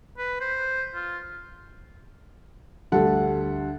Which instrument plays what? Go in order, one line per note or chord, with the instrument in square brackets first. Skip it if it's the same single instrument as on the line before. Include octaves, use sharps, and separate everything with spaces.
[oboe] B4
C5
F4
[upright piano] D2 G3 A4 F#5